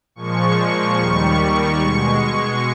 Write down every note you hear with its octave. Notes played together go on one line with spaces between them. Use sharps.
A#2 F3 G#3 C#6
C#6
D#2 D#3 G3 C#6
B2 G#3